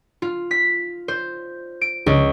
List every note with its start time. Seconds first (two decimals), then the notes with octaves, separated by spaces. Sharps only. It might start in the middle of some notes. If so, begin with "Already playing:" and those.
0.22 F4
0.51 B6
1.08 C5
1.81 D7
2.06 C#2